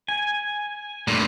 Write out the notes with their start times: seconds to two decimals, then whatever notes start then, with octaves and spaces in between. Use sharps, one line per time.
0.09 G#5
1.08 G2 A#2 A3